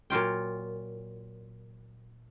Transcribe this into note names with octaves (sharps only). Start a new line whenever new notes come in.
A#2 F#3 F4 G5